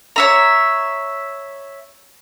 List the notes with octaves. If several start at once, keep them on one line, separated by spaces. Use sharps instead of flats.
C#5 E5 A#5